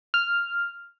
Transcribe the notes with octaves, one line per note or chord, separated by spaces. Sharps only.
F6